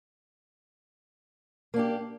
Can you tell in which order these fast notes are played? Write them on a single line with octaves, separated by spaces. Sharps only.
A#3 D4 G4